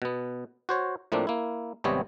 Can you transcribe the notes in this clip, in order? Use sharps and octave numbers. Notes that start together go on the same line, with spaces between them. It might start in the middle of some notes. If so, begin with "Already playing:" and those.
B2 B3
F#4 C5 C#5
A2 F3 A3 A#3 C4 D4
A#3 E4
G#1 C3 G3 B3 C4 C#5